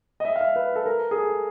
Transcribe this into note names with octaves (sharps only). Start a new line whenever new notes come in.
D#5
E5
F5
E5
B4
A4
A#4
G#4
A4